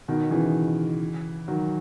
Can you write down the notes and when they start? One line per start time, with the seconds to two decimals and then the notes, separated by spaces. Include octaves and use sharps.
0.08 B2 D#3
0.31 C#3 E3
1.48 D#3 F#3